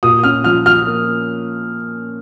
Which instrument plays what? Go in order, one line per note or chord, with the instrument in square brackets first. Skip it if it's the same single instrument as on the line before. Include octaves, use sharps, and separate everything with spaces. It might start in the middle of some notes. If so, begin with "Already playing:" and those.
[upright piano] A#2 [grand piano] D#6
[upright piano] C#4 [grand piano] F6
[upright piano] F3 [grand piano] F6
[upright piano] F3 [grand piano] F6
[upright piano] A#3